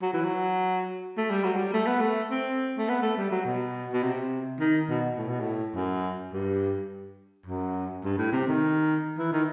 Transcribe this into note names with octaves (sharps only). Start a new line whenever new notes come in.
F#3
E3
F#3
A3
G3
F#3
G3
A3
B3
A3
C4
A3
B3
A3
G3
F#3
B2
B2
C3
D#3
B2
A2
B2
A2
F#2
G2
F#2
G2
A2
C3
D#3
E3
D#3